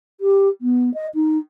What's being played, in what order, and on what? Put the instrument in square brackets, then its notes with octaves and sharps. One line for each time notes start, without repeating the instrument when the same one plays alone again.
[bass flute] G4
B3
D#5
D#4